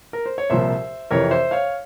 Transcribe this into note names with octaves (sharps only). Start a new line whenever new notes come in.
A#4
C5
C#5
C2 A#2 F3 C5 E5
F2 C3 E3 A#4 C#5
C5 E5
C#5 F5